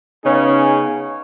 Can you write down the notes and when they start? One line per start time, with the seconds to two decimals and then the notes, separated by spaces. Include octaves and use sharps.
0.23 C#3 B3 C#4 D#4 G#4